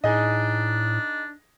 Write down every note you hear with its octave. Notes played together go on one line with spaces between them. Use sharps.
A2 D4 D#4 G#4 D#5